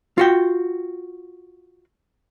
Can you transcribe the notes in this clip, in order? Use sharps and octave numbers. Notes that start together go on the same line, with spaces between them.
F4 F#4 G5